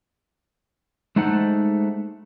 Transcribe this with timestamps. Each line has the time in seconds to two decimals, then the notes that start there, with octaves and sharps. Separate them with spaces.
1.16 G#3 A3 D#4 C5 F#5